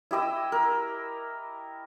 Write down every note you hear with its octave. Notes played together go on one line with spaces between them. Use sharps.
E4 G4 D#5 E6
A#4